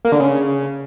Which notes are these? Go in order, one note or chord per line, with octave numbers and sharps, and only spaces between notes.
A#3
D3
C#3